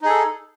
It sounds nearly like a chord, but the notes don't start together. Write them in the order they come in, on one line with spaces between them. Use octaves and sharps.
D#4 G#4 A4